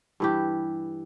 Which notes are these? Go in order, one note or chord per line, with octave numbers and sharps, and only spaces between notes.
G2 E3 G4